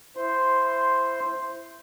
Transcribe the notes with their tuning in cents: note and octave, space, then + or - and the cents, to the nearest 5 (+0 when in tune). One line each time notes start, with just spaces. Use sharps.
E4 +20 C5 +0 C6 +0